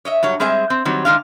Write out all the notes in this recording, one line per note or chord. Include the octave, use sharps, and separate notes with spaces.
C#5 D#5 E5
G2 F#3 C#5
G3 G#3 C4 G#4 E5
C4
D#3 F#3 G3 C4
D#3 G#3 D4 F5